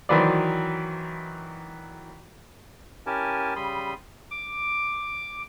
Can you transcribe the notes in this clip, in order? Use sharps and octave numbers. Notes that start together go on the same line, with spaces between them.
D#3 E3 F#3 B4 C5 D5
C#4 E4 G4 A#4 G#5 A5
C#3 G3 B5 C6 D#6
D6